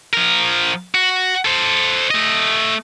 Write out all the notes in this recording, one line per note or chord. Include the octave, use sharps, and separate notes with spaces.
F3 A#4
F#4
A4 C5
A3 D#5